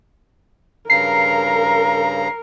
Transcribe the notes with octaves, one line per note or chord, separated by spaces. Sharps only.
G2 C#3 A#4 A#5 C7